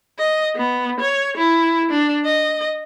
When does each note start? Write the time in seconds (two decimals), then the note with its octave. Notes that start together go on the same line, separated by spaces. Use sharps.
0.19 D#5
0.56 B3
1.00 C#5
1.37 E4
1.91 D4
2.25 D#5